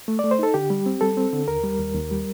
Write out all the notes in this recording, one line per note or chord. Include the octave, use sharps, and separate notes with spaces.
A3
A3 D5
C5
D#4 A4
D3 G4
G3
C4
G3 A4
C4
D3
D#2 A#4
G3
D#2
D#2
G3